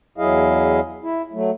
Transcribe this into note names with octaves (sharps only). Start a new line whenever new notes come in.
E2 F#3 E4 G#4 D#5 F5
E4
F#3 A3